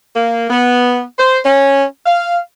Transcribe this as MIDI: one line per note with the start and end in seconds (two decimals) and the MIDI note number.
0.15 0.46 58
0.50 1.03 59
1.18 1.38 72
1.44 1.82 61
2.06 2.37 77